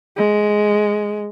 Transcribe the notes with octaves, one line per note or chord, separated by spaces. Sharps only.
G#3